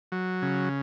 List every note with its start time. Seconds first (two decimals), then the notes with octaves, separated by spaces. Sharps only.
0.12 F#3
0.42 C#3